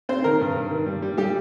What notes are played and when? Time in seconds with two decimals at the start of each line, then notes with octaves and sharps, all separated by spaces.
0.09 C4 C5
0.24 D#3 A#4
0.40 G2
0.56 G2
0.71 D#3
0.86 G3
1.02 G3
1.17 G3 G4